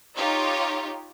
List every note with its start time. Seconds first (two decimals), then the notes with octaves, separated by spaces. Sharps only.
0.16 D#4 F4 G4 C#5